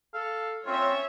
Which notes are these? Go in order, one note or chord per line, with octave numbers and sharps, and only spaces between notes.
A4 F5
C4 C#4 F4 C#5 E5